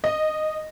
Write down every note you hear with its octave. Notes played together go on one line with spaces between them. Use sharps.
D#5